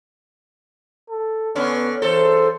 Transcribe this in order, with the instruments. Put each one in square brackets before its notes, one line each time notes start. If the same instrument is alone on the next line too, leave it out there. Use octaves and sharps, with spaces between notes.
[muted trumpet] A4
[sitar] D3 C#4 [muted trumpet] B3
[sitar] E2 A4 [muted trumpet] C5